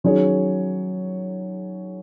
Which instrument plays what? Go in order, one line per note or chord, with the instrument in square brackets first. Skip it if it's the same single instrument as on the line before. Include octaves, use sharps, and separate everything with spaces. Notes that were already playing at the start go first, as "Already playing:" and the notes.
[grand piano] D#3 F#3 C#4 G#4 C#5